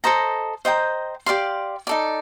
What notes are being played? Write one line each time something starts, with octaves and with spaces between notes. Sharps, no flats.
A4 C5 D#5 A#5
C5 D#5 G5 A#5
G4 D5 F5 C6
D#4 A4 D5